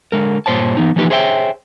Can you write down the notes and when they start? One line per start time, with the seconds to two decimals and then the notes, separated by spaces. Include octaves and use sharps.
0.12 D3 G#3 A#4
0.46 G2 A#2 C5 C#5 A5
0.77 E3 B3 D#4
0.96 E3 F3 A#3 D#4 G4 B4
1.10 G#4 C5 C#5 E5 F#5 G5